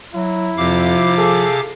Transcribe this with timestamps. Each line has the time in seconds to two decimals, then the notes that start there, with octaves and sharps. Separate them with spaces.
0.15 F#3 E4
0.57 F2 C3 F3 F5 D6
1.18 G#4 A4